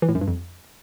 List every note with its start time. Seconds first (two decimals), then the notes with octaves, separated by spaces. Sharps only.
0.02 E3
0.09 A2
0.15 F#2
0.21 G2
0.28 F2